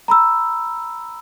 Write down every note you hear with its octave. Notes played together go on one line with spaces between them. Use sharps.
A#5 B5 E6